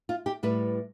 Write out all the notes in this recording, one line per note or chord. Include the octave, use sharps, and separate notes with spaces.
F4
G4
A2 G3 B4